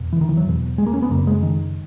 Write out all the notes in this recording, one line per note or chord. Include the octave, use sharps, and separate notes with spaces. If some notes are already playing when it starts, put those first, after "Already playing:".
Already playing: E2 B2
E3
D#3
E3
F#3
E2 B2
G#3
A#3
C#4
B3
F#2 C#3 A#3
G#3
D#3